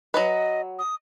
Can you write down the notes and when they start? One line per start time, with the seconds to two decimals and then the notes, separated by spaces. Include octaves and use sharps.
0.14 F#3 F#4 B4 D#5
0.79 D#6